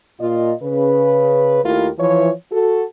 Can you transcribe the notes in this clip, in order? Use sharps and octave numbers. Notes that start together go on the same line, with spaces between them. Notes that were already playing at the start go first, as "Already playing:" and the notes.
A#2 F4 D#5
C#3 B4
D#2 A3 E4 F4 G4 A#4
E3 F3 C#5
F#4 A4